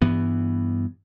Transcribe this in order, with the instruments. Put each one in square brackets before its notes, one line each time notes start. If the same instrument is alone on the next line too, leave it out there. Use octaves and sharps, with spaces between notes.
[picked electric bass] G2 E3 B3